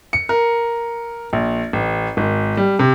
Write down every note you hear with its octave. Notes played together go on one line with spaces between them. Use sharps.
C#7
A#4
A#1
A1
G#1
G3
C3